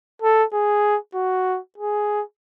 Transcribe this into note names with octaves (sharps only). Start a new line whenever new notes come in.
A4
G#4
F#4
G#4